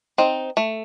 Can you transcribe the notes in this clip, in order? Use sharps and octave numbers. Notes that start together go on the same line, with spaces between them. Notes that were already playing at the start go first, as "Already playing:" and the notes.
C4 D#4
A3